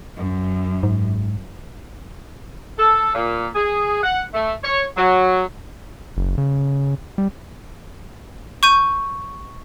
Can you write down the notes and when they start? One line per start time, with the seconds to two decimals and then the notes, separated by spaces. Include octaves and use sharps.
0.16 F#2
0.83 G#2
2.78 A4
3.14 A#2
3.55 G#4
4.03 F#5
4.34 A3
4.64 C#5
4.97 F#3
6.17 F#1
6.38 C#3
7.18 G3
8.63 C#6 G6 D#7